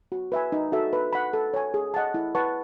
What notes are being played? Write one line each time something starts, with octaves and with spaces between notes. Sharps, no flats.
F#4
B4 E5 G#5
D#4
F#4 A4 E5
B4
F#5 B5
A4
C#5 G#5
G#4
D#5 F#5 A5
E4
B4 F#5 A5 C#6